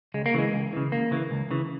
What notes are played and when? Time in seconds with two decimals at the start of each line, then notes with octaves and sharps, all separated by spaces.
0.14 C#2 G#3
0.26 A#3
0.34 C#3 E3 G#3
0.53 C#2
0.73 C#3 E3
0.92 C#2 A#3
1.11 C#3 E3
1.31 C#2
1.51 C#3 E3